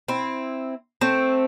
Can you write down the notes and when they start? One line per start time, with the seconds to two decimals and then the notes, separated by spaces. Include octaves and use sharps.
0.08 C4 E4
1.01 A3 C4